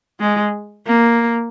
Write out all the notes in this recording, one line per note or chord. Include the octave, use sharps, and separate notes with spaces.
G#3
A#3